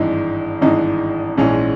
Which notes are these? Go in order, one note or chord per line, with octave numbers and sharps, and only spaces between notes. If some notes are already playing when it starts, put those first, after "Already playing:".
Already playing: G#1 G2 E3 G#3 D#4
G#1 G2 E3 G#3 D#4
A#1 G#2 E3 G#3 C#4